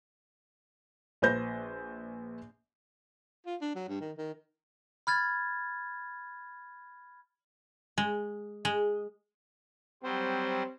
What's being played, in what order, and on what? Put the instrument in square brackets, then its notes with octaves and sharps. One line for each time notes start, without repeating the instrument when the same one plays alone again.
[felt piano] A#1 B4 C5 G6 A#6
[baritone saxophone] F4
D4
F#3
G2
D#3
D#3
[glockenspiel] B5 F6 G#6 A6
[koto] G#3
G#3
[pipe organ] F#3 G3 C5 [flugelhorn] C4